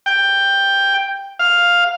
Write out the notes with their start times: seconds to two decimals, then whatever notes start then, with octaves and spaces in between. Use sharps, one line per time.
0.06 G5
1.39 F5